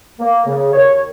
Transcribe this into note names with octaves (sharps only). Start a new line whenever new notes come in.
A#3
C#3
D#2 C#5